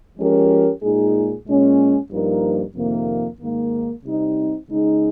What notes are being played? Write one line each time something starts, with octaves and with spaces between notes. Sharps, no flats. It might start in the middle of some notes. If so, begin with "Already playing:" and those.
F3 G#3 C#4 G4 A#4
A#2 G#3 D#4 G#4
A#2 G#3 C#4
G2 F3 A#3 D#4 A#4
F2 C3 D#3 A#3
G#2 D#3 A#3
C3 G3 C4 D#4
C#3 G#3 D#4 G#4